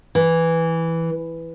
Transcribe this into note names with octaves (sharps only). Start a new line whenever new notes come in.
E3